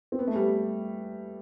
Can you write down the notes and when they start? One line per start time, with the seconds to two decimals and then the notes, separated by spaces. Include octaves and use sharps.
0.12 C4
0.19 B3
0.27 A3
0.36 G3